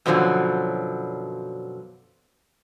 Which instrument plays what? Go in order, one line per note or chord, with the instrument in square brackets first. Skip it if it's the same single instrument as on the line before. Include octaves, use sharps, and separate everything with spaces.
[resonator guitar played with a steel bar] F#2 B2 D3 F3 F#3